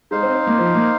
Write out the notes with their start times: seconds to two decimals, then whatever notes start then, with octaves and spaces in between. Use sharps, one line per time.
0.11 G#3 D#4 C5 F5
0.23 C4
0.35 C4
0.47 A#3
0.59 F3
0.74 A#3